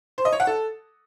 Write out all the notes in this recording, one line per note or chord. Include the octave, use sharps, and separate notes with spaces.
C5
D#5
C#5
F#5
A4